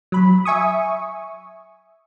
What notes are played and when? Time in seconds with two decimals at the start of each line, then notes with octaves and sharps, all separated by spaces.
0.12 F#3 B5
0.45 E5 G#5 C#6 D#6